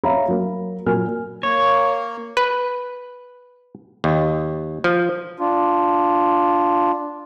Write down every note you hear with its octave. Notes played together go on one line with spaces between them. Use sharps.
C#5 E5 F5 A#5 B5
F#3 A#3
A#2 F#3 A#4 G#5 F6
A#3 C#5
B4
D#2
F3
D4 F4